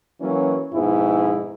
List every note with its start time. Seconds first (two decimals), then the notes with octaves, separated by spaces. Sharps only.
0.21 E3 F#3 A#3 C#4
0.73 F2 G#2 B2 E4